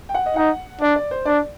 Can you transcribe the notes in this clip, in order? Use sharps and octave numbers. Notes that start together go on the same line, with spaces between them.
G5
F#5
D#5
D#4 F#5
D4 D5
D5
C5
D4 D5